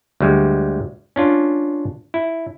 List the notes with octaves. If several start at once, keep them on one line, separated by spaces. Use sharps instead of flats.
D2 G3 G#3
C#4 D4 F4
E4